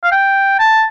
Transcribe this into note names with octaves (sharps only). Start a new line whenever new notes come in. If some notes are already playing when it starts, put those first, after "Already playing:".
F5
G5
A5